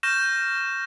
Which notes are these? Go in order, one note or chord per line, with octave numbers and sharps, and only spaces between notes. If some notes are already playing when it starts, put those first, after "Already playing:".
C#6 F6 G6 A#6 E7